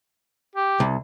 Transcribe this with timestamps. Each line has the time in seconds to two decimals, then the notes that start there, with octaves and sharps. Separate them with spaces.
0.55 G4
0.80 C2